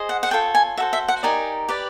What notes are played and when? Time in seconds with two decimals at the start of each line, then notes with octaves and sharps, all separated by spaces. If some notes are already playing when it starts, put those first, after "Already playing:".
Already playing: G#4 C5 D#5
0.09 F#5
0.23 F#5
0.31 F4 A4 C#5 G5
0.55 G#5
0.77 F#4 A4 C5 E5
0.93 E5
1.08 F#5
1.23 D#4 G4 A#4 D5 G#5
1.69 G4 B4 D5